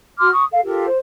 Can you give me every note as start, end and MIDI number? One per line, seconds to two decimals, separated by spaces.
0.19 0.29 66
0.19 0.29 84
0.19 0.29 86
0.19 0.29 89
0.32 0.44 85
0.32 0.44 87
0.51 0.60 69
0.51 0.60 77
0.64 0.86 65
0.64 0.86 67
0.64 0.86 69
0.64 0.86 70
0.86 0.98 72